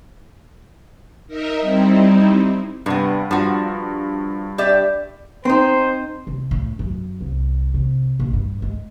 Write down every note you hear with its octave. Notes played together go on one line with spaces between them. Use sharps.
D#4 A#4 D#5 E5
G3 C4 D#4 E4
G2 C3 B3
G2 F3 F#4
G4 D5 E5
C4 D#4 C5
C2
A2
F#2
C2
C3
A#1
G2
G#3